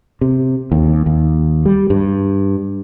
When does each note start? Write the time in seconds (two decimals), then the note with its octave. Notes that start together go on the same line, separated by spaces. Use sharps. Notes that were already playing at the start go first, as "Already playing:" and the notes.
0.21 C3
0.72 D#2
1.06 D#2
1.66 G3
1.90 G2